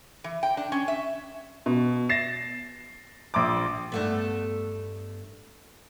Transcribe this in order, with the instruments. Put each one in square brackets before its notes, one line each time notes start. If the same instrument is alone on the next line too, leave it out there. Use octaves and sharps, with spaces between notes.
[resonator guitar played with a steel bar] E3
G5
D4
C#4
E5
[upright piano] B2
A6 A#6 C7 E7
A#1 C6 D6
[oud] G2 A3 B3